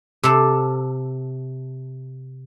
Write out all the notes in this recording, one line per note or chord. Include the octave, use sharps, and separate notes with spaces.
C3 A4